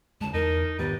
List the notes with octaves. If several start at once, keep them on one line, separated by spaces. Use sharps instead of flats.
D3 G#3 A5
E2 D#4 A#4
G#2 D#3 G3 B3 B4